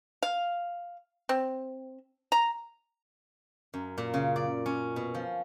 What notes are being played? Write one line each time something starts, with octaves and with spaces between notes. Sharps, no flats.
F5
C4
A#5
F#2
A#2
C#3
D5
C#4
B2
F3